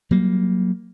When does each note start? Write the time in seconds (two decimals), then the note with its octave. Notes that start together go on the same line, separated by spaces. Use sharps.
0.11 F#3 G3 A#3